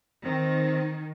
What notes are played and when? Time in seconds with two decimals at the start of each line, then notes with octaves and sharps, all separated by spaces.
0.25 D#3 C4